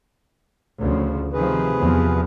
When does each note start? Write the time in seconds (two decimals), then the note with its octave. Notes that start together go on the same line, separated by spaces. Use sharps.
0.81 D2 C#3 F3
1.33 C3 D#3 F3 G#4 B4
1.79 E2 F3 B3